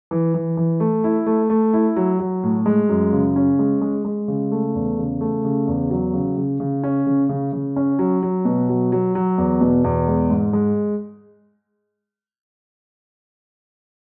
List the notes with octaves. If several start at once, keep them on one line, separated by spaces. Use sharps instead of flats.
E3
E3
E3
A3
E4
A3
A3
E4
F#3
F#3
A2
G#3
F#2
C#3
C#4
G#3
G#3
G#3
C#3
A3
E2
C#3
A3
C#3
E2
F#3
C#3
C#3
C#3
C#4
C#3
C#3
C#3
C#4
F#3
F#3
B2
F#3
F#3
F#3
E2
B2
E2
G#3
G#2
G#3